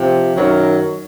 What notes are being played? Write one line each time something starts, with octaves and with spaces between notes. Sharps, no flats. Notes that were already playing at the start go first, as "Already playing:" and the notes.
Already playing: C3 F3
F#2 D#3 F#3 A#4